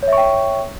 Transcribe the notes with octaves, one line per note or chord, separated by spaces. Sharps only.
C#5 E5 G5 C#6